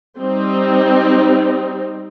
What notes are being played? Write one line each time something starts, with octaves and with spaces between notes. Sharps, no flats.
G3 C4 D#4